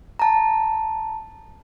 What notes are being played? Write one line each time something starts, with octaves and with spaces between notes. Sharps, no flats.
A5 A#5